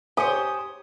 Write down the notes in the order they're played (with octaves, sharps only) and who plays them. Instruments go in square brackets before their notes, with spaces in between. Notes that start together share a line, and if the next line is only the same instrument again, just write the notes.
[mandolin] G4 C5 [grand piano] C#5 G#5 [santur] D#6